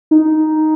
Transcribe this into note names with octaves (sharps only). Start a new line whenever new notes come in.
D#4